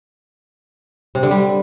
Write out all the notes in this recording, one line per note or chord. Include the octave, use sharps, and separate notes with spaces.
C3
D3
G3